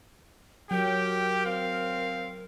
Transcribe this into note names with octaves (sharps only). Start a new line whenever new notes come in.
F#3 G4 A#4 G5
C4 F5